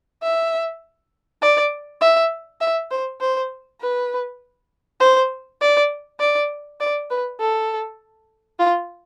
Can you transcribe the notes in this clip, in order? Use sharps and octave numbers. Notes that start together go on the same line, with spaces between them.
E5
D5
E5
E5
C5
C5
B4
C5
D5
D5
D5
B4
A4
F4